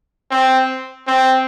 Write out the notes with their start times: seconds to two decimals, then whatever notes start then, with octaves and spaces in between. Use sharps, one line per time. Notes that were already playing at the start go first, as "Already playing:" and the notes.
0.31 C4
1.08 C4